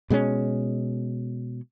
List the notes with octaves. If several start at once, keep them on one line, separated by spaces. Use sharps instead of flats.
B2 G#3 B3 C#4